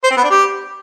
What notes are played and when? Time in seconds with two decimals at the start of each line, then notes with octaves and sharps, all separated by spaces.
0.04 C5
0.11 C4
0.17 B3
0.24 D4
0.30 G4